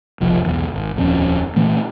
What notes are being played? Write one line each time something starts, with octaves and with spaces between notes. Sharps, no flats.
F1 B1 F3
B1 E2
G#1
D#1 F2 C#4
A#2 E3 A3